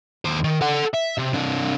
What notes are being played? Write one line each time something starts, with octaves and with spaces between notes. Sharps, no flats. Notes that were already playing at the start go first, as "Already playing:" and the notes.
D#2 C5
D#3
A4 F#5
E5
C3
C3 D4